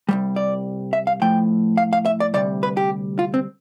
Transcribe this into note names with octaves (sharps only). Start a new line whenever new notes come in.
C2 B2 G3
D5
E5
F5
A2 F3 A3 G5
F5
F5
E5
D5
D2 C3 G3 D5
B4
G4
F4
C4